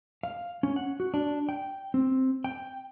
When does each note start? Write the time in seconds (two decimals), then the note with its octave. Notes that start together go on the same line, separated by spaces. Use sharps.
0.23 F5
0.63 C#4
0.76 F#5
1.00 F#4
1.14 D4
1.49 G5
1.94 C4
2.44 G5